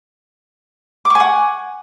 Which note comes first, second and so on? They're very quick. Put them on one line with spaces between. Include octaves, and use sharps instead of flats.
D6 C#6 G#5 F#5